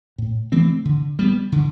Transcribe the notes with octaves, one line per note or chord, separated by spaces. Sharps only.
A2
E3 A3 C4
D3
G3 B3
D3